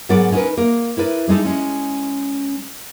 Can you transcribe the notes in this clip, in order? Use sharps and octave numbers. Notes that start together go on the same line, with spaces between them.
G#2 F#3 B3 A#4 D5
C#4 D#4 A#4 B4
A#3 A#4
E4 A#4 B4 D5
G3 G#3 D#4 A4
G#3 C#4